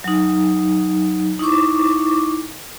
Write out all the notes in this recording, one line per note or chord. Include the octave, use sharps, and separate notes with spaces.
F#3 D#4
D#4 E4 C#6 D6